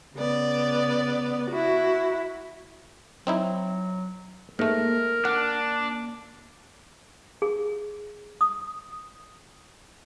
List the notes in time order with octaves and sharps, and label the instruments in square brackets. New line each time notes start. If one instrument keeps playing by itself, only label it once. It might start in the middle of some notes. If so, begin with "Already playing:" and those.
[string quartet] C#3 B3 D5
E4 F#4
[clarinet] F#3 [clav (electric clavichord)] C4 D#4 E4
[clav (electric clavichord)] G#2 A3 [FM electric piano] A#3 [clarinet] A#4
[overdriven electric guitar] D4 [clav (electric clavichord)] F#5
[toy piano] G#4
D#6